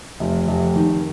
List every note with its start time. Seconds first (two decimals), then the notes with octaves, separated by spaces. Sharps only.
0.20 F1
0.48 F1
0.76 D#3